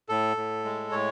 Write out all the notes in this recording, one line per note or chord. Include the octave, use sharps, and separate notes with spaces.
A2 A4
A2
G#3
A2 C#5